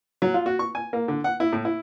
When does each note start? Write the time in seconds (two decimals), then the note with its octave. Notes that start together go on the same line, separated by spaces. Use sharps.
0.22 F#3
0.34 F4
0.46 F#4
0.59 C#6
0.75 G#5
0.93 A#3
1.08 D3
1.24 F#5
1.40 E4
1.53 A2
1.65 E4